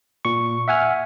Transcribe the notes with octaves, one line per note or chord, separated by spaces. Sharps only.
A#2 C#6
E5 F#5 G#5 F6